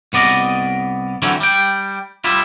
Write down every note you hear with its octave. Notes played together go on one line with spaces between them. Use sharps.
C2 B3 D5 D#5
D3 E3 F#3 C4 C#4
G3 G5
G3 E4 F4